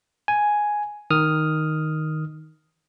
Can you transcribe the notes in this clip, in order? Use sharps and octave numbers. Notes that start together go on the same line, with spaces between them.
G#5
D#3 D#6 F6